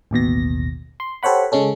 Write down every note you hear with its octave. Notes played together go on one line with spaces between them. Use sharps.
A1 D#2 B2 A#6
C6
G4 A4 C5 C#5 F#5 B5
C#3 G#3 C#4 A4